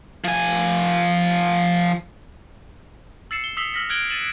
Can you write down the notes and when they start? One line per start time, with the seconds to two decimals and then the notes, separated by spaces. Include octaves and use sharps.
0.24 F3 G#5
3.31 E6 A6 C7 C#7 E7
3.44 G7
3.57 D#6 E6 B6 C7 F#7 G7
3.74 E6 F6 A#6 B6
3.89 F6 F#6 G#6 D7 F#7 G7
4.10 A6 D#7 E7 F#7